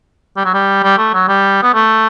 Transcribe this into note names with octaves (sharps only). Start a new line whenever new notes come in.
G3
F#3
G3
G3
A3
F#3
G3
B3
A3